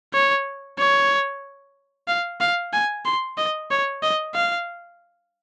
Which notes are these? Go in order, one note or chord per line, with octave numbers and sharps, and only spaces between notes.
C#5
C#5
F5
F5
G#5
C6
D#5
C#5
D#5
F5